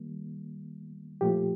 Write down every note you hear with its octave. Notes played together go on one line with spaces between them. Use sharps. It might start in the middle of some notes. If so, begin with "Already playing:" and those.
Already playing: D#3 G3 A#3
A#2 F3 A3 G4